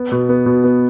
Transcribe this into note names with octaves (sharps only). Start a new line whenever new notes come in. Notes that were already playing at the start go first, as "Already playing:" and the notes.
Already playing: B3
B2
B3
B2
B3